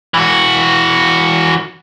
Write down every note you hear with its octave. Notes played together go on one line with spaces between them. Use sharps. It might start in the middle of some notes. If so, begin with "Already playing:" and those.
E3 F#4